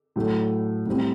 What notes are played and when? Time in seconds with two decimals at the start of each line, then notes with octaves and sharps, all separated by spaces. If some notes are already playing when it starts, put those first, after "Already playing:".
0.16 A2 F#3 A3
0.86 A2 G3 C4